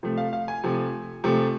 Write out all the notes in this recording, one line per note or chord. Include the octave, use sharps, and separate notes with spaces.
C3 F3 A3
F5
F5
G#5
C3 F3 A3
C3 F3 A3